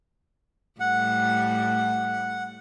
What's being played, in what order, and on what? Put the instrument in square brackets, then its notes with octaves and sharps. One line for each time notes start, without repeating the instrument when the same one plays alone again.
[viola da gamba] A2 G3 [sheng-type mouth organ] F#5